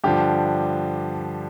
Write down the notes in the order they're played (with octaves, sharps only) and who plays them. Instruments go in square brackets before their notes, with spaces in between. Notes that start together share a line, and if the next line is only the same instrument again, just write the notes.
[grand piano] G2 D3 F3 G4